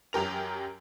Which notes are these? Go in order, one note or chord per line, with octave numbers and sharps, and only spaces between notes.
F#2 F#3 G4 A#4 F7